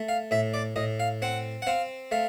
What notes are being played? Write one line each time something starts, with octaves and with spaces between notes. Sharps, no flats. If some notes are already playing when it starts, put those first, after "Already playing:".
Already playing: A3
F5
A2 E5
D5
A2 D#5
F5
C4 F#5
F#5
C4 F5
A3 F5